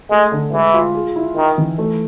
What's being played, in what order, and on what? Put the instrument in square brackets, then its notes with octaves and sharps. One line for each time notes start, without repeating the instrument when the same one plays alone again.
[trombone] G#3 [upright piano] A3
[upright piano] D3
[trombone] E3 [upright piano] G#3
[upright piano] F4
G#4
E4
[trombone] D#3 [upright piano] D#4
[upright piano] E3
A3